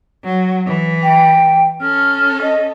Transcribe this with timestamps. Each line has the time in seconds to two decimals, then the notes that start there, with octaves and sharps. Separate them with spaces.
0.24 F#3
0.66 E3
1.03 G5
1.81 C#4 A4 F6
2.42 D#5